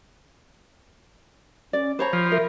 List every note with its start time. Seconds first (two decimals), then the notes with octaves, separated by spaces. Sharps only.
1.73 C#4 D5
1.99 C5 C#5 A#5 B5
2.13 F3
2.31 A#4 E5